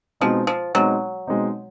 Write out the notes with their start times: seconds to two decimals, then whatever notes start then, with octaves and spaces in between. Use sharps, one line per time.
0.21 B2 F3 G#3 C4 D#4
0.47 F3
0.74 B2 F#3 G#3 C4 D#4
1.27 B2 G#3 C4 D#4